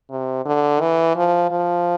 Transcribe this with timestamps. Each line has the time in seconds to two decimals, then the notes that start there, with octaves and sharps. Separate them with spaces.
0.10 C3
0.45 D3
0.81 E3
1.16 F3
1.51 F3